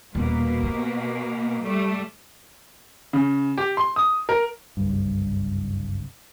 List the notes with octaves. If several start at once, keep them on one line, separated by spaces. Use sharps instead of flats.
D#1 B2 A#3
C3
G3 A3
C#3
G4
C6
D#6
A#4
F#1 C2 G2